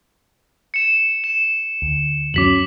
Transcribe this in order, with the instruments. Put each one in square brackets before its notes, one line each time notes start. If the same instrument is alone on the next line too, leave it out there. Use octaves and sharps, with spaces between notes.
[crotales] C#7 E7
E7
[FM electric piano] D2
[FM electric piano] F#2 F#3 C#4 [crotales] D6 B6 F#7